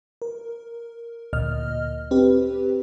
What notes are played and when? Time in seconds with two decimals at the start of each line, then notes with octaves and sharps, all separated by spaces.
0.22 A#4
1.33 D2 A#2 D#5 F6
2.11 C4 G4 B4